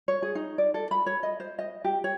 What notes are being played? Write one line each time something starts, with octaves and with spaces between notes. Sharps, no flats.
C#5
G#4
D#4
D5
A4
B5
C#5
D#5
C5
D#5
G4
C#5